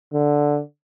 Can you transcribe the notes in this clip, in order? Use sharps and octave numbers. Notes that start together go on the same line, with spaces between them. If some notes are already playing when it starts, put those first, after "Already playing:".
D3